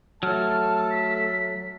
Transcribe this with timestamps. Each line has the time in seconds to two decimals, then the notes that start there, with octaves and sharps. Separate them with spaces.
0.23 F#3 A3 A4 A5 F6
0.91 B6